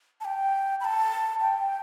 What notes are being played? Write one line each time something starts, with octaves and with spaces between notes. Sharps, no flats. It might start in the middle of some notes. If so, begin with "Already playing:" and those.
A5
G5
B5
A5
G5